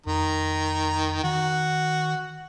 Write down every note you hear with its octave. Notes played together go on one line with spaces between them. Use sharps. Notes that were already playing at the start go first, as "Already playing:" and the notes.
F2 D#3 A#5
D#3 F#4